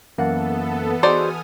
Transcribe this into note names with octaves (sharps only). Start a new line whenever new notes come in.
F#2 E3 A#3 B3 A4 F#5 A5
D#4 F#4 G#4 C5 D5 G#5 D#6 F6